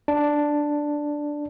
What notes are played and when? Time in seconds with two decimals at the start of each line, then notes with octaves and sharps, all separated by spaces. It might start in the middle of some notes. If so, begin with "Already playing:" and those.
0.08 D4